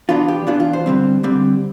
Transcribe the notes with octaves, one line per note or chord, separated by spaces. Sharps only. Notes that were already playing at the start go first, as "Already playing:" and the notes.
E3 B3 D4 F4
G4
E3 B3 D4 F4
F4
C5
D3 G3 C4
D3 G3 C4